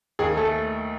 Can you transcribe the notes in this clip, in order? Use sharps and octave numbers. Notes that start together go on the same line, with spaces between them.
D#2 G#4
A3 A4